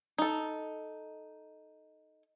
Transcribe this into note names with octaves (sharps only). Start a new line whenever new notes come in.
D#4 A4